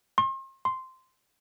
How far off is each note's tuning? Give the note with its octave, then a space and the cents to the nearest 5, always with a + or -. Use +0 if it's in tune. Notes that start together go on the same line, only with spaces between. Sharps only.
C6 +40
C6 -10